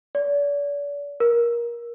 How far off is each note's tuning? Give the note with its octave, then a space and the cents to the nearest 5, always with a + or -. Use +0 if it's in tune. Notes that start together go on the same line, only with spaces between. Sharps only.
D5 -40
A#4 +20